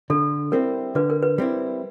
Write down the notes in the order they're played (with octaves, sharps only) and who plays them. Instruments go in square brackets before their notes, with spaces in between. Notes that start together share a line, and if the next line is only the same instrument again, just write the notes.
[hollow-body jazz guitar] D3 [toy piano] A4
[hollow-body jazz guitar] G3 C4 E4 [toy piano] A#4
[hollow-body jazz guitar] D3 [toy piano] B4
[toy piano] A#4
B4
[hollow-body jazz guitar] G3 C4 E4